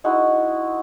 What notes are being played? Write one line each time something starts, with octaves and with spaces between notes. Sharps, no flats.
G#3 D#4 E4 F#4